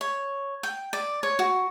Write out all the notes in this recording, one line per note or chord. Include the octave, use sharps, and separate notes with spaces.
C#5
G5
D5
C#5
F#4